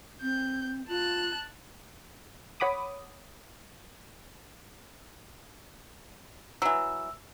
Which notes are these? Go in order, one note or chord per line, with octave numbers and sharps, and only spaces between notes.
C4 G6
F4 A5 F#6
C#5 F#5 B5 D6 D#6
E3 F#3 E6